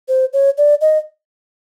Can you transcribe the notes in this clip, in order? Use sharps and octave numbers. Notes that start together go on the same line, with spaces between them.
C5
C#5
D5
D#5